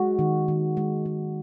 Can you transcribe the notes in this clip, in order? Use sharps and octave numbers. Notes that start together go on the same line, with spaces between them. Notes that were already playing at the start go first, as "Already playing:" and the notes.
Already playing: G#3 F#4
D#3
D#3
G#3
G#3